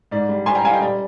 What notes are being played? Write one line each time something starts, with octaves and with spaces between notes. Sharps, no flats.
G#2 D5
G3
G3 G#5 C6
G5 A#5
G3 F5 G#5
D#5 G5
G3 D5